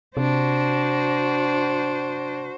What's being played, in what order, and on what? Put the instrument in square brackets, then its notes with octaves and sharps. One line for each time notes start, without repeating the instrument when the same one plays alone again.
[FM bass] C3 [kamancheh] D4 [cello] F#4 C5